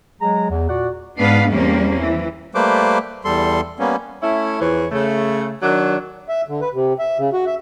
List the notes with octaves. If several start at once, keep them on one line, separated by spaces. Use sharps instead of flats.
F#3 G#3 G#4 A#5
E2
A#2 F#4 D5 F#5
G#2 B3 D4 B4 F5
E2 G3 A#3 C4 C#4
E3
G3 A3 A#3 B4 C5 D6
E2 G3 A4 C6
G3 A#3 B3 C#4
A3 C#4 E4
E2 E3 F3 C#5
C#3 A3
D#3 F#3 D4
E5
D3
B4
C3
E5
C#3
F#4
E5